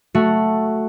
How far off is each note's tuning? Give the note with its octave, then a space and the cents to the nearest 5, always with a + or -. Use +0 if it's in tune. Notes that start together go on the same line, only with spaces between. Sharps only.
A3 +0 F#4 +0